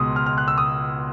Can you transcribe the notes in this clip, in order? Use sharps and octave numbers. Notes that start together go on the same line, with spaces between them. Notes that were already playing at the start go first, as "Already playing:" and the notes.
Already playing: C#2 B2 G#3 C6 D#6
F6
F6
F#6
E6
D#6